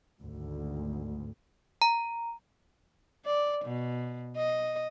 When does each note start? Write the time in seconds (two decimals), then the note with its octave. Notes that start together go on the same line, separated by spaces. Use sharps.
0.20 G#1 D2
1.82 A#5
3.26 D5
3.65 B2
4.37 D#5